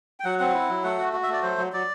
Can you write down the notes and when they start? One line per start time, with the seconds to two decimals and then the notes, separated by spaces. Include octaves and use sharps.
0.20 G5
0.24 F#3 F#5
0.39 C4 F#5
0.54 E4
0.69 F#3
0.84 A3 F#5
0.98 F#4
1.13 F#4
1.23 E5
1.29 A3 D5
1.42 F#3 C5
1.58 F#3
1.73 F#3 D5